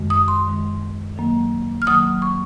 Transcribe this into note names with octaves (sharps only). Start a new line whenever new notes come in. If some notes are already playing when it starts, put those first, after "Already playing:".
Already playing: F#2 D#3 G#3
D#6
C6
F#2 D#3 G#3
D#3 F#3 A#3
F6
D#3 F#3 A#3 D#6
C#6